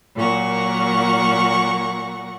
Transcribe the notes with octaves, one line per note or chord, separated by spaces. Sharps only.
A#2 F#3 A#3 F#5 C#6